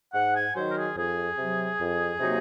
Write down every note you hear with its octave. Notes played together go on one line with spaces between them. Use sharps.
G#2 F#5
G#5
D#3 F#3 C5
A#4
G#4
F2 G#4
C3 F#3
F2
C3 F#3 A#3 D#4